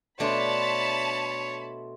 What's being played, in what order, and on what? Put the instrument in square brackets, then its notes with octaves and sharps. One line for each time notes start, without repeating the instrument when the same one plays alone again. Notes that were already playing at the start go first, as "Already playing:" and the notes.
[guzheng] B2 D4 [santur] A3 C6 [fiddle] C#5 [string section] A5 B5